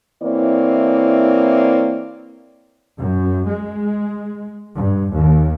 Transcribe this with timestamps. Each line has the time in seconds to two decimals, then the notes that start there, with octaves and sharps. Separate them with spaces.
0.22 E3 A#3 C4 E4 C#5 D5
2.99 F#2
3.48 G#3
4.75 G2
5.15 D#2